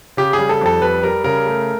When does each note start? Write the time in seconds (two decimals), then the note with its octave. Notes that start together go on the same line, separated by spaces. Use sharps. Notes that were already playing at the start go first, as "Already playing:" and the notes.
0.17 C#3 G4
0.33 G#4
0.39 G3
0.49 A4
0.61 F2 A4
0.82 G3 B4
1.03 G3 A#4
1.24 C#3 A#4
1.46 A3